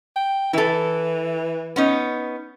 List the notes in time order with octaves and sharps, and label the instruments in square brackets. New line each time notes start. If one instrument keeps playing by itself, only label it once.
[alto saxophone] G5
[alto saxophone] E3 [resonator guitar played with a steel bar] E4 A4
[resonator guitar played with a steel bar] B3 C#4 D#4